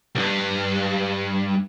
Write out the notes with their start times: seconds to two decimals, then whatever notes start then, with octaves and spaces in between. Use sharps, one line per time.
0.15 C2 G2